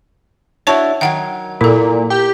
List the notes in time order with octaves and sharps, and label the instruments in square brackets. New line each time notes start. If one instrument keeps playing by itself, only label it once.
[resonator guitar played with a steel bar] D4 E4 F#4 [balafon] C#5 A5 C#6
[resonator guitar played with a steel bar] D#3 F#3 [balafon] F#5 G5
[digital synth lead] A#2 [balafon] E4 A4
[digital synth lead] G4